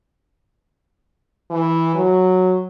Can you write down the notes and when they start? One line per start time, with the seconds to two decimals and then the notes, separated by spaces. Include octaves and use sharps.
1.51 E3
1.95 F#3